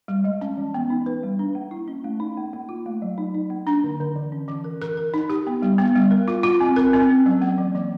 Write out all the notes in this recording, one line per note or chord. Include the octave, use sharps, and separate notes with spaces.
G3
G#3
C#4
E3
B3
D#4
B4
G3
D4
A#3
E4
C#4
A3
D#4
A#3
A#3
F4
A3
F#3
D#4
D#4
A#3
D4
D3
D3
E3
C#4
E3
A#4
A#4
A#4
D#4
G4
B3
G3
B3
G3
A#4
F4
F4
C4
A#4
C4
C#4
F#3
A#3
E3
E3